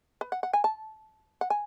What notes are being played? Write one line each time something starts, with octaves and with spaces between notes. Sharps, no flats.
B4
F#5
F#5
G#5
A5
F#5
G#5